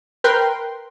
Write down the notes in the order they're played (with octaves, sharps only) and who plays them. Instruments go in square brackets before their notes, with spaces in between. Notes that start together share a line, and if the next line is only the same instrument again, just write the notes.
[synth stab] A#4 B4 G5 C6